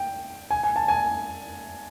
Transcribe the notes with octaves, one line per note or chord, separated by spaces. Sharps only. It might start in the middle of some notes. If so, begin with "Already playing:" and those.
Already playing: G5
G#5
G#5
A5
G#5